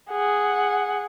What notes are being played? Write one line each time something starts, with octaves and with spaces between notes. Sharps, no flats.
G#4 F#5